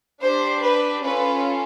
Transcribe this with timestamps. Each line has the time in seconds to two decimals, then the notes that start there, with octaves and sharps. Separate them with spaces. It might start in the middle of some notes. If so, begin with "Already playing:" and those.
0.22 D4 G4 C5
0.62 B4
1.02 C#4 F4 A4 B4